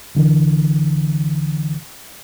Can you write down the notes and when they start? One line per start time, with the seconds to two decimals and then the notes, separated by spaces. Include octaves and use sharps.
0.15 C2 D3 E3